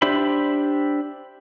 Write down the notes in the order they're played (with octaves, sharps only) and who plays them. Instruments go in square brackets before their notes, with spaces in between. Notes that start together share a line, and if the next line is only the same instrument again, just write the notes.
[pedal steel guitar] D4 G4 C5 E5 B5